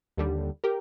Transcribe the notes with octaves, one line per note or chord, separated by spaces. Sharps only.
D#2 D3 G3
G4 A#4